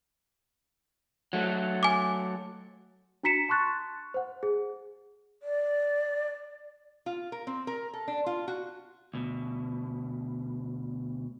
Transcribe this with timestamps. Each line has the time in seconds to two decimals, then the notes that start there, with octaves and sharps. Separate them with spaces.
1.33 F#3 A3
1.83 G#5 D6
3.23 D4 F#4 A#5 B6 C#7 E7
3.49 A5 C6 C#6 F#6 A6
4.14 C5 F#5
4.43 G#4
5.43 D5
7.06 F4
7.32 A#4
7.47 C4
7.67 A#4
7.93 A4
8.08 D4
8.26 F4
8.48 F#4
9.14 D2 B2